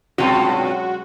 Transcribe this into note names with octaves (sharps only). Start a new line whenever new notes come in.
G2 B2 F#3 G#3 C#4 F4 F#4